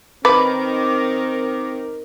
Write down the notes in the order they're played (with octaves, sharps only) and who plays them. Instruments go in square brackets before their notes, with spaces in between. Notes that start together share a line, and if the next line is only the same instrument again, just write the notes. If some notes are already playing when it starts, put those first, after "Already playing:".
[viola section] D#3 A#4 [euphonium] C4 [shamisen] B4 [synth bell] D6